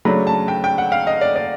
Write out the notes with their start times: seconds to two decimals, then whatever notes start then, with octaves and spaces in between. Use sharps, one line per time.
0.05 C#3 F#3 A3 D4 B5
0.27 A5
0.48 G5
0.64 G5
0.78 F#5
0.92 F5
1.07 D#5
1.21 D5
1.36 D5